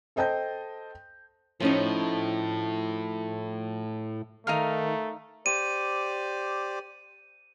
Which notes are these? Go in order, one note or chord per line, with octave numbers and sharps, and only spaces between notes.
A4 C5 D#5 G5 A5 G6
A2 F3 C#4 D#4
D#3 A3 D#4 A#4 F5
G4 C5 D5 D#7